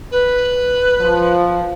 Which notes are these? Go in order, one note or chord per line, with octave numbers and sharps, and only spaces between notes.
B4
F3